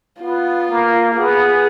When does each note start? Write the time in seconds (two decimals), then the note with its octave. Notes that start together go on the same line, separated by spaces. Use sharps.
0.22 B3 F4
0.70 A#3
1.17 B3 G#4